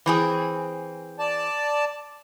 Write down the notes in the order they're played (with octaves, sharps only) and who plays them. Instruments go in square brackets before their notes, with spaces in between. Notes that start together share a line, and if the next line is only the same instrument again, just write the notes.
[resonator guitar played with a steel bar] E3 C4 G#4
[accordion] D5 A5